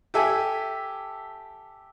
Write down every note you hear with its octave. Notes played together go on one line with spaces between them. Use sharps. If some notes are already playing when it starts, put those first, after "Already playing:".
G4 A4 E5 G#5